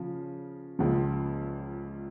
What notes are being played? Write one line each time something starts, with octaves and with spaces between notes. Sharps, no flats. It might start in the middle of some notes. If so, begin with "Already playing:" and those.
Already playing: C#3 F3
C#2 C#3 F3